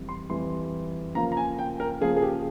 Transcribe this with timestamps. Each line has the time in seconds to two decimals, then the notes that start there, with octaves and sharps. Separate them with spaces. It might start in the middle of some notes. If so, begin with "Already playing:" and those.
Already playing: F2 E3 G3
0.09 C6
0.30 F2 E3 G3 C6
1.15 C#3 F3 A#3 F4 A#5
1.32 A#5
1.37 G#5
1.59 G5
1.80 A#4
2.01 C#3 F3 A#3 F4 G#4
2.16 G#4
2.22 G4